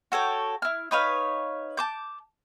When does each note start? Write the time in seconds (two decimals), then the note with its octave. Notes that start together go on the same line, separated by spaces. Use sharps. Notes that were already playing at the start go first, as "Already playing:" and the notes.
0.12 F#4 A4 C#5 G5
0.62 E4 F6
0.91 D#4 B4 C#5 F5
1.77 A5 D6 G6